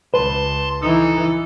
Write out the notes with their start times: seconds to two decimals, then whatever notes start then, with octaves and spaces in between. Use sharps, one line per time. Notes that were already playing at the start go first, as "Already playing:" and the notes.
0.14 C#2 B4 A5 C6
0.82 E3 D#4 A4